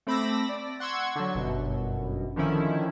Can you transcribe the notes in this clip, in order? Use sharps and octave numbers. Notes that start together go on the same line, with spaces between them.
A3 C4 B5 D6 E6 A#6
D5
F#5 C6 C#6 E6 G#6
D3 F#3
G1 F#2 B2
D3 D#3 F3 C#4 E4